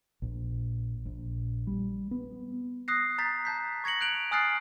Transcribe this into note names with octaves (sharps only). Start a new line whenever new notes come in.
A#1
A#1
G3
B3
D#6 F#6 A#6 C7
A#5 G6 A6 B6
A5 G6 B6
C#6 G#6 A#6 C#7 F#7
F#6 G6 D7 F7 F#7
G#5 D#6 F6 F#6 A6 C7